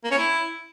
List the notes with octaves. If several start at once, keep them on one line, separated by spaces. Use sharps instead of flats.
A#3
C#4
E4